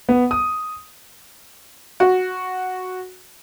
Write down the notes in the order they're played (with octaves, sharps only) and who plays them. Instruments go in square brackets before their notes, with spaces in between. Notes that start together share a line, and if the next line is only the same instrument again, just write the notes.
[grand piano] B3
D#6
[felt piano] F#4